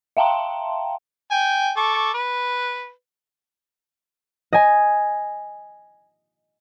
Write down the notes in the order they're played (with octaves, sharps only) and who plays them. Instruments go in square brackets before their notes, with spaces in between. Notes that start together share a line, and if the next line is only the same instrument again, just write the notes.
[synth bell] E5 F5 G5 A5 A#5 C6
[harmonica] G5 G#5
A4 C#6 D6
B4
[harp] D#5 G#5